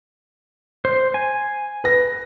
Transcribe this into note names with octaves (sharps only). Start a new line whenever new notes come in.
C5
G#5
B4 A#6